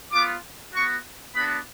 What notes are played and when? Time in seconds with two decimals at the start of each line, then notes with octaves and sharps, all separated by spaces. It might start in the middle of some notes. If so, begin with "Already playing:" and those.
0.12 B3 F4 D6
0.74 B3 F#4 C#6
1.35 B3 D4 F#4 B5